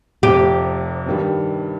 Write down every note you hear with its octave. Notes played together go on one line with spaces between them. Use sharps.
F1 F2 C3 G4
G2 D#3 G3